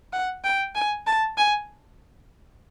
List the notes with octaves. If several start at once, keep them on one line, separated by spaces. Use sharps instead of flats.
F#5
G5
G#5
A5
G#5